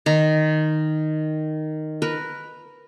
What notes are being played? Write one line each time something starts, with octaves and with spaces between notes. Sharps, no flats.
D#3 A#5
A#4 B4